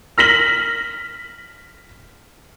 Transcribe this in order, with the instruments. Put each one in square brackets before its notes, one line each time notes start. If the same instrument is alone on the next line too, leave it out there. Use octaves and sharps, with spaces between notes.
[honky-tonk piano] F6 A#6 B6 F#7